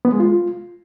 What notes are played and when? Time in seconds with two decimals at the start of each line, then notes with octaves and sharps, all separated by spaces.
0.05 B3
0.12 G#3
0.20 F4